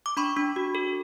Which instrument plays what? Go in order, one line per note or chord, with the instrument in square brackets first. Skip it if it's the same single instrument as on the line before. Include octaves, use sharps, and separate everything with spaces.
[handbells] D6
D4 B5 C#6
D4
F#4
A4